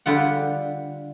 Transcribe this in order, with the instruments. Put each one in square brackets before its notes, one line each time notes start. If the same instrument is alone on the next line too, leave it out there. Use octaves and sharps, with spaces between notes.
[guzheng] D3 G3 F4 F#5